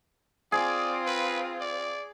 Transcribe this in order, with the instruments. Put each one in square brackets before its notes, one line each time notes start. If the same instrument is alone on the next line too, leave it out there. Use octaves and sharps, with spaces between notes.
[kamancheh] C4 F4 [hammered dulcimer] G#4 [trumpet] D5
[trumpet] B4
D5